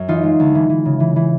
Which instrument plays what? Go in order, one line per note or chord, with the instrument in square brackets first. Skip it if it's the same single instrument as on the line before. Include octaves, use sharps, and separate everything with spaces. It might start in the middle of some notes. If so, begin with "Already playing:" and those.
Already playing: [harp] F#2
E3 D#4 F4
G#3
D2
E3
E3
C#3
E3
E3